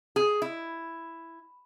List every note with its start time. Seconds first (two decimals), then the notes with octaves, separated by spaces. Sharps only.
0.16 G#4
0.42 E4